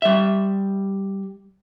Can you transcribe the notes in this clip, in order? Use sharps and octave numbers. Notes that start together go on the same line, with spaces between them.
G3 E5